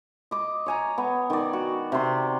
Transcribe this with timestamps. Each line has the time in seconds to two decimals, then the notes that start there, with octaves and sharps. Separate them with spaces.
0.31 D#5 D6
0.66 C#5 G#5 A#5
0.98 B3
1.30 D#3 D5
1.53 F#4
1.92 C3 C6